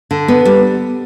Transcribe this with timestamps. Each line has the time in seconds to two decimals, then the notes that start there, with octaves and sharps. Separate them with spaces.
0.11 D3
0.28 B3
0.45 G3